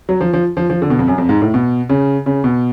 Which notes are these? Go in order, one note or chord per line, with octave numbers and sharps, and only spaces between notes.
F#3
F3
F3
F3
F3
D3
B2
F2
F#2
F2
G#2
A2
B2
C#3
C#3
B2